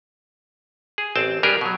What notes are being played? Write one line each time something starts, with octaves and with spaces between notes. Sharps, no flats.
G#4
A1 C4 G5 A5
G3 D4 G4 G#4 A#4
B2 F#3